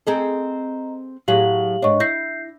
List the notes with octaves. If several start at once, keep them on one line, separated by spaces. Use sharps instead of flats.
C4 G#4 A4 D#5 A#5
A2 F#3 G4 G#4 F5 F#7
G#2 D4 C#5 D#5 C#6
E4 G6 A#6 C7